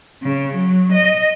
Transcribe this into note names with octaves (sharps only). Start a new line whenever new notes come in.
C#3
F#3
D#5